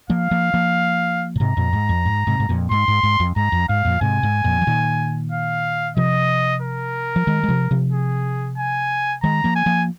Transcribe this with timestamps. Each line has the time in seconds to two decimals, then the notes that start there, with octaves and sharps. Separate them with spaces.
0.10 F3 A#3 F5
0.31 F3 A#3
0.54 F3 A#3
1.36 A#2
1.40 G#2 C3 A#5
1.57 F2 A#2
1.73 G#2
1.89 F2
2.05 G#2
2.27 G#2 C3
2.40 G#2
2.49 F2 A#2
2.71 G#2 C6
2.88 G#2
3.03 G#2
3.20 F2
3.36 G#2 A#5
3.52 F2
3.69 G#2 F5
3.85 F2 A#2
4.01 G#2 C3 G#5
4.23 G#2
4.44 F2 A#2
4.62 F3
4.67 A#2 D#3
5.32 F5
5.97 C3 F3 D#5
6.62 A#4
7.16 F3
7.27 D#3 G#3
7.44 G#3
7.49 C3 F3
7.71 C3 F3
7.92 G#4
8.58 G#5
9.23 D#3 G#3 A#5
9.44 F3 A#3
9.56 G#5
9.66 F3 A#3